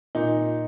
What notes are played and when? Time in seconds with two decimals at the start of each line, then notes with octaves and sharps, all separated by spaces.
0.15 A#2 D#4